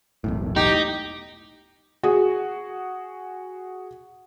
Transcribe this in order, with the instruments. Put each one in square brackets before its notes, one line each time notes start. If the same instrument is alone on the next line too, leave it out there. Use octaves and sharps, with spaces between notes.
[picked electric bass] E1 B1 A2
[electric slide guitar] D#4 [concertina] G4 G5
[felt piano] F#4 G#4